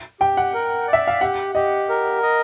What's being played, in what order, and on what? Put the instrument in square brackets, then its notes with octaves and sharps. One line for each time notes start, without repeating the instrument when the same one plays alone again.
[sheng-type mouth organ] G4 [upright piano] G5
[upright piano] F#5
[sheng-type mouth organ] A#4
D5
[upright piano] E5
F5
[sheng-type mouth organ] G4 [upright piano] F#5
[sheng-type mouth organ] G4 [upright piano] D#5
[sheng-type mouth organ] A#4
D#5